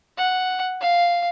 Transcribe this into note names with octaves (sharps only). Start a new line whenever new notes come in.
F#5
F5